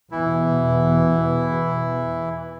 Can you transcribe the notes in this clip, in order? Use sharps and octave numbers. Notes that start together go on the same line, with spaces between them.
E2 B2 E3 E4